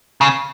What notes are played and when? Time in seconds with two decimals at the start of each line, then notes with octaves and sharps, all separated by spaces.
0.21 C#3